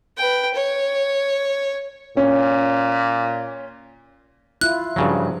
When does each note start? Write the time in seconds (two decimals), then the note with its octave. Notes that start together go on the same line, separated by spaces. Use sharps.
0.18 B4 G5
0.54 C#5
2.17 A#2 C#4
4.61 E4 F4 F#6
4.96 G2 C#3 F3 F#3